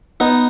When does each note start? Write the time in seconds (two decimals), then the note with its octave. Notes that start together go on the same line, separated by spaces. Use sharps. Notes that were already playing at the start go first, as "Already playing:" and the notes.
0.20 B3 D#4